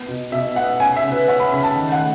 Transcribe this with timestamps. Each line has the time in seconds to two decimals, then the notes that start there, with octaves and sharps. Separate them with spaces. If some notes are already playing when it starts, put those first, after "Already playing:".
Already playing: B3
0.08 B2
0.32 B2 E5
0.56 B3 F#5
0.80 C#4 G#5
0.97 E5
1.03 C#3
1.12 B4
1.28 C#4 F#5
1.40 B5
1.51 C#3 B5
1.63 A5
1.75 D#3
1.92 F#5
2.00 A3